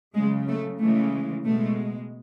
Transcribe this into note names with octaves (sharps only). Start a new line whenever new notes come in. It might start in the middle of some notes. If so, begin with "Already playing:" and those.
C#3 F#3 G#3
A3
C#3 E3 G#3 A3
B2 G#3 A3